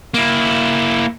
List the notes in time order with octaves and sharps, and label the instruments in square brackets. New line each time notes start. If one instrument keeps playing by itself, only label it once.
[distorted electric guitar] A#3 E4